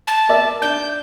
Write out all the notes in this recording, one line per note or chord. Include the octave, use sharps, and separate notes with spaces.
A5
A#4 D5 E5
D4 G6